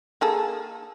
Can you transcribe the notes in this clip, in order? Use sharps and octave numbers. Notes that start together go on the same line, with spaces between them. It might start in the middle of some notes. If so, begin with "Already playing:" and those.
A#3 G#4 A4